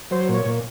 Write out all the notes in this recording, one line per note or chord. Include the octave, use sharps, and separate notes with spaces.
F#3 C5
A#2
C#5
A#2